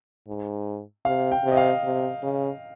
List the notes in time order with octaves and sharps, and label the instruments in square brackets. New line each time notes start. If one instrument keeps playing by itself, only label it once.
[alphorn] G#2
[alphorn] C3 [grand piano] F5
[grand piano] G5
[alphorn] C3
[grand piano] D#5
F5
[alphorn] C3
C#3